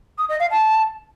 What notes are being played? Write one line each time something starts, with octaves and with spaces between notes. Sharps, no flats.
D#6
D#5
F5
A5